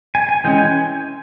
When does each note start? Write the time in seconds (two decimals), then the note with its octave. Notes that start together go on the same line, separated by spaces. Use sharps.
0.15 G#5
0.29 G#5
0.44 E3 G#3 C#4 G5
0.58 G#5